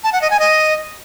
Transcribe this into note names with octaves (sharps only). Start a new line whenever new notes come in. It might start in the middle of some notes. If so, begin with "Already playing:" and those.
A5
F#5
D#5
G#5
D#5